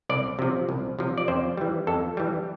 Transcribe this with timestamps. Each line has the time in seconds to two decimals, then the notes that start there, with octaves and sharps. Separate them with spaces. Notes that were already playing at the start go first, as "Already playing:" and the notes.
0.09 C2 D5
0.39 C3 F3
0.69 C2
0.99 C3 F3
1.18 D5
1.28 F2 C5
1.57 E3 G3
1.87 F2 A4
2.17 E3 G3